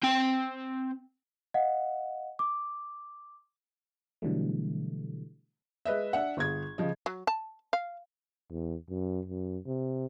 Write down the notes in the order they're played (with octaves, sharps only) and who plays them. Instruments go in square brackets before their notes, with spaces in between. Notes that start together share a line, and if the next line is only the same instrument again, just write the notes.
[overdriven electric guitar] C4 G5
[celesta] D#5 F5 F#5
D6
[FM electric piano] B2 D3 E3 F#3 G3 A3
[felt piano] G#3 B4 D#5 E5
D4 E5 F#5
G1 G#4 G#6
C#3 F3 D#5
[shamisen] F#3
A5
F5
[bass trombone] E2
F#2
F#2
C3